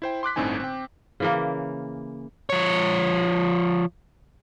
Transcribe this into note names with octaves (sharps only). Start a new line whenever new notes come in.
E4 C5 G5
C6 D6 F#6 B6
G1 A2 D3 C4 D#4 G#5
C4 G5
C#3 E3 A#3
F3 C#5